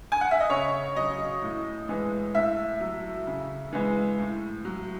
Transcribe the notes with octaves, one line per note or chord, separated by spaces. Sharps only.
G#5
F#5
E5
D#5
C#3 C#5
F#3 D#5
A2
E3 G#3
A2 E5
F#3
C#3
E3 G#3
A2
F#3